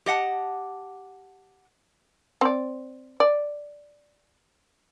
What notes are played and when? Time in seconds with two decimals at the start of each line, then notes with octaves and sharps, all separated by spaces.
0.06 G4 D#5 F#5 A5
2.41 C4 D5
3.20 D5